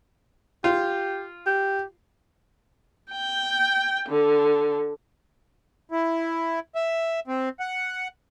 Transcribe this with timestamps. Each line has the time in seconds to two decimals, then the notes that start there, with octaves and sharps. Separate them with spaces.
0.64 F4 G4
1.47 G4
3.12 G5
4.09 D3
5.91 E4
6.75 E5
7.27 C4
7.60 F#5